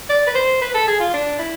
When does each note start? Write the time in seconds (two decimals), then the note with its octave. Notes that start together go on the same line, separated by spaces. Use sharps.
0.09 D5
0.27 B4
0.35 C5
0.61 B4
0.74 A4
0.87 G#4
1.00 F4
1.14 D4
1.39 E4